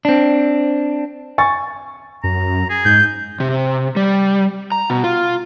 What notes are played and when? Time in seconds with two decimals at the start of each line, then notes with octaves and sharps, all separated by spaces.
0.05 C4 D4
1.38 G#5 C#6 A6
2.24 F#2 A#5
2.70 G#4
2.85 G#2 G6
3.40 C3
3.96 G3
4.72 A#5
4.90 B2
5.04 F4